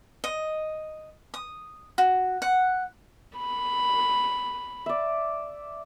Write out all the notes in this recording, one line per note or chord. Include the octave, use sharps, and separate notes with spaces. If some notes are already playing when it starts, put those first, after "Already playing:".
D#5
D#6
F#4
F#5
B5
D5 E5